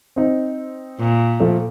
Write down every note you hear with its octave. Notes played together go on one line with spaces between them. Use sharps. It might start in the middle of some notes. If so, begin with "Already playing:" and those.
C4 D#4
A#2
F3 A3